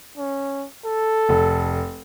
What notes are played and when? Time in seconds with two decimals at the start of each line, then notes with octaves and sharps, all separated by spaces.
0.18 C#4
0.85 A4
1.29 F1